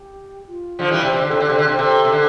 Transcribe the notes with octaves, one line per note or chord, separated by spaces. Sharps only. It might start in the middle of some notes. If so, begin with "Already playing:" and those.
Already playing: G4
F4
D3 F3
E3 G3
C3
C3 G4
D3
C3 A4
D3
C3 A4
D3
C3 G4
C3 A4
C3
D3